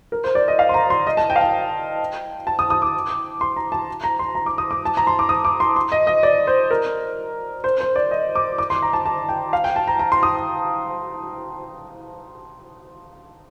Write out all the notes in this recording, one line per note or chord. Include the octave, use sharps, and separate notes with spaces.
A#4
C5
D5
D#5
F5
C6
A#5
C6
D#5
A5
G5
F5
G5
A5
D#6
D#6
D6
C6
A#5
A5
A#5
C6
A#5
D6
D#6
D6
A5
A#5
C6
D6
D#6
D6
C6
C6
D#5
D#5
D5
C5
A#4
C5
C5
D5
D#5
D6
D6
C6
A#5
A5
A5
G5
F5
G5
A5
A#5
A#5
C6
D#6